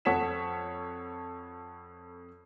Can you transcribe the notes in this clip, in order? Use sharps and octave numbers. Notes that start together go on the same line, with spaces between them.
F2 A4 C#5 F#5 B6 E7